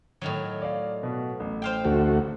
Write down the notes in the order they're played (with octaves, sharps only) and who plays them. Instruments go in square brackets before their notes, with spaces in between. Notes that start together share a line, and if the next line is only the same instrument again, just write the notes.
[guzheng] A2 D#3 F#3
[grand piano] D5 D#5 F5
B2 B3
A1
[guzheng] C5 F5 G5
[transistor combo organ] D2 A3 F#4